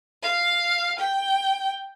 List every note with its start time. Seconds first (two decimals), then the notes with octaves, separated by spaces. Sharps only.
0.23 F5
0.99 G5